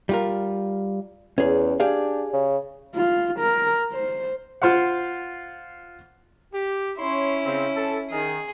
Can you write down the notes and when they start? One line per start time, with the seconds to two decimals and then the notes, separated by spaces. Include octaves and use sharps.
0.09 G3 F4 A#4
1.38 E2 C#4 G#4
1.80 D4 G4 G#4 F5
2.33 C#3
2.95 F4
3.39 A#4
3.92 C5
4.62 F4 C5 F5 F#5
6.52 G4
6.97 C#4 E4 C#5 C6
7.44 C#3 C4
7.75 A4
8.11 D#3 G#4